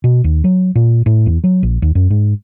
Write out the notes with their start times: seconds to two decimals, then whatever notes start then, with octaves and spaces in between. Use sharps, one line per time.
0.04 B2
0.24 D#2
0.44 F#3
0.76 A#2
1.06 A2
1.26 E2
1.44 F#3
1.63 A#1
1.82 D#2
1.95 F#2
2.10 G#2